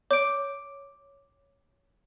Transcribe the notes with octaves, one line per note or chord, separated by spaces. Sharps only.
C#5 D6 D7